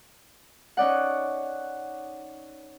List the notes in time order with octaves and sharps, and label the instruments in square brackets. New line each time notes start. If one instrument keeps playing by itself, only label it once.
[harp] C#4 D#4 D5 F#5